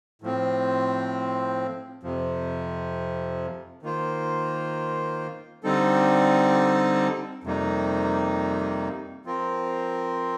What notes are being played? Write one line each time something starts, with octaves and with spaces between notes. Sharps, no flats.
A2 F3 C4
F2 C3 F3
D#3 A#3 F4 C5
D3 G3 C4 D#4 A4
F2 C3 G3 A#3 D#4
F3 C4 F4 A#4